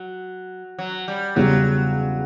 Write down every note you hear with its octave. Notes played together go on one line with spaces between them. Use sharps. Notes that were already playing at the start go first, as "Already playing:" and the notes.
Already playing: F#3
F#3
G3
E2 C#3 F#3 G3 C#4